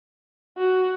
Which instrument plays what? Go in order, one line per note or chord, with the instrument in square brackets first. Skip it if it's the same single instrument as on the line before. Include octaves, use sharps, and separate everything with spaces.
[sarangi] F#4